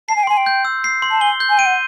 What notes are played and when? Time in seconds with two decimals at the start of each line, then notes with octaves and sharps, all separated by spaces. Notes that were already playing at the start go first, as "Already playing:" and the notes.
0.09 A5 C7
0.16 G#5
0.23 G5
0.27 G#5 C6
0.37 G5
0.46 G6
0.65 E6
0.84 C7
1.02 C6
1.11 A5
1.21 G#5 G7
1.40 G6
1.49 G#5
1.58 G5 D#7
1.66 F#5